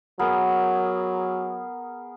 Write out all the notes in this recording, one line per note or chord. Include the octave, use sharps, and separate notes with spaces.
F#3 B3 G#4 A#4